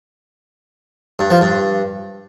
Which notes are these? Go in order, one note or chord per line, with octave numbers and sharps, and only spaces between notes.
G2
F3
G2